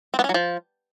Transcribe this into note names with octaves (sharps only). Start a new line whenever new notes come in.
C4
B3
C#4
F#3
F3